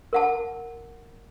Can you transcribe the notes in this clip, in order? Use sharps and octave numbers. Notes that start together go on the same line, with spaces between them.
A#4 F#5 A5